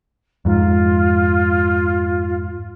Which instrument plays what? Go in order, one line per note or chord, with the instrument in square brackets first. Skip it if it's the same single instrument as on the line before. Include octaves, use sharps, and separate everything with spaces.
[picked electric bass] F2 G#2 [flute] F4